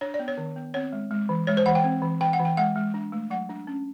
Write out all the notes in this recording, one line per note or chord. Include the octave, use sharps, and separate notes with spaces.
D4 C#5
D5
B3
C#5
D#3
B3
C4 C#5
G#3
G#3
E3
G#3 C#5
C5
E3 F#5
G5
C4
E3
E3 G5
F#5
E3
G5
G#3 F#5
G#3
D4
A3
F#3 F#5
D4
C#4